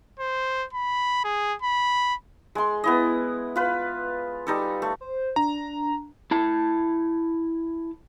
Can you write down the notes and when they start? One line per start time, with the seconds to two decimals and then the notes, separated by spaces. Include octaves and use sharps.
0.19 C5
0.73 B5
1.24 G#4
1.62 B5
2.55 G#3 C6
2.84 B3 E4 D#5
3.56 F4 B4
4.47 G3 D#4 A4
4.82 A3
5.01 C5
5.36 D4 A#5
6.31 E4 A5